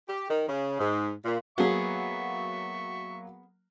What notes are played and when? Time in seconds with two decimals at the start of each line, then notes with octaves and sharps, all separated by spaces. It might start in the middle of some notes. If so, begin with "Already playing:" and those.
0.07 G4
0.29 D#3
0.47 C#3
0.79 G#2
1.24 A#2
1.58 F#3 A#3 B3 F#4 G#4 E5 C#6